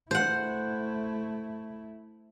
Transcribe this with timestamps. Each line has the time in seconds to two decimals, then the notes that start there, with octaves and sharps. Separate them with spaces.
0.11 A3 E4 C5 F#5